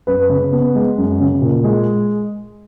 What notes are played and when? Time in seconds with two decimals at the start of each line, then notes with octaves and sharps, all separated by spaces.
0.07 F#2 B4
0.29 C#3
0.52 B3
0.75 G#3
0.98 F#2
1.20 C#3
1.42 A#2
1.64 G#3